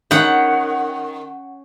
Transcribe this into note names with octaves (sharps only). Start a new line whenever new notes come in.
D#3 C#4 F#5 B5 G6